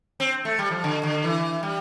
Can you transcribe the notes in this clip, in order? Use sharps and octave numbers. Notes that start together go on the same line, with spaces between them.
C4
A3
G3
F3
D3
D3
E3
G3